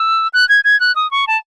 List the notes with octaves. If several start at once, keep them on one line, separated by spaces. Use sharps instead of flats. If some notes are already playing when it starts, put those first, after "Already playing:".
Already playing: E6
F#6
G#6
G#6
F#6
D#6
C#6
A5